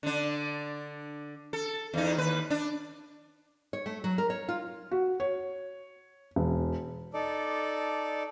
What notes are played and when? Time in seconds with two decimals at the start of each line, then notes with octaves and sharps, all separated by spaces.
0.03 D3 D4
1.53 A4
1.94 E2 D#4
2.17 D#2 B4
2.50 D4
3.73 C#5
3.86 A3
4.04 F#3
4.18 A#4
4.30 C#5
4.49 F4
4.91 F#4
5.20 C#5
6.36 E1
7.13 D#4 A4 D5